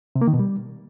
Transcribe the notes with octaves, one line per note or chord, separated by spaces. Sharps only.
C3
A#3
D#3
B2
G3